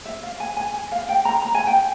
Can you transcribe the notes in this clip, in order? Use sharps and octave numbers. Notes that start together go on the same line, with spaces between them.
E5
F5
G#5
G#5
G#5
F5
G5
A#5
A#5
G#5
G5